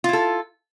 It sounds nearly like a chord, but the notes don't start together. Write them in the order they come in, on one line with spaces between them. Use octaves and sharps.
F4 E4 A4